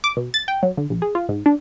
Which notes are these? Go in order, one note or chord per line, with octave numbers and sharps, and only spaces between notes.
D6
B2
A6
G5
F#3
D3
A#1
G#4
F4
G#2
D4